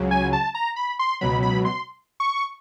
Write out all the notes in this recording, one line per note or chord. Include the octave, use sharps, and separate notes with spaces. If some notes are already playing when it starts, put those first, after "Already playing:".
Already playing: C#2 C#3 F#3
G#5
A5
A#5
B5
C6
C#2 B2 F#3 B5
B5
C6
C#6